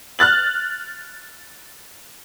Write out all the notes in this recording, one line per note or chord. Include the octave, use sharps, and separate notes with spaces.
F6 F#6 A6 F#7